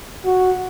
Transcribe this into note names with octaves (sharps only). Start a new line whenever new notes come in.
F#4